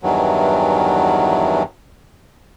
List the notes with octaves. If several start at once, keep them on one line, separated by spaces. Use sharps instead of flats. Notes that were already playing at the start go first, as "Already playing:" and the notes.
E2 G2 D#3 E3 F#3